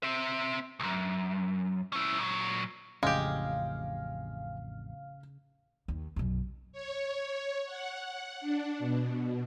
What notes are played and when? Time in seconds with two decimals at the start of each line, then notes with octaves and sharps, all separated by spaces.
0.03 C4 E5
0.80 B1 F#2
1.93 C#4 E4
2.18 A#2 F#3
3.03 A1 F2 A2 C#3 G#3 G4 F5
5.88 D#2
6.16 B1 F#2
6.72 C#5
7.66 F#5
8.41 D4
8.79 B2